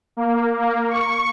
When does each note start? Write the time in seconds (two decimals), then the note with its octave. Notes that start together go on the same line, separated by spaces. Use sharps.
0.17 A#3
0.57 A#3
0.90 C#6